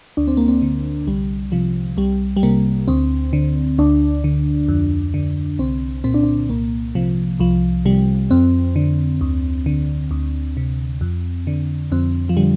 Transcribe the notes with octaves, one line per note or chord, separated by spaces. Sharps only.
D2 D4
C4
A#3
C4
D3
C2 G3
C3 F3
C2 G3
G3
C3 A#3
D2 C4
D3
D2 D4
D3
F2
D3
C2 C4
A#2 C4
D4
C4
C2 A#3
C3 F3
C2 F3
C3 G3
F2 C4
D3
D2
D3
D2
C3
F2
D3
F2 C4
F3
D3 G3